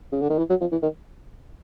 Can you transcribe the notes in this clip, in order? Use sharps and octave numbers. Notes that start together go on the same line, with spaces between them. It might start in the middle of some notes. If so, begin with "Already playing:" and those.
C#3
D3
D#3
E3
F#3
F3
E3
D#3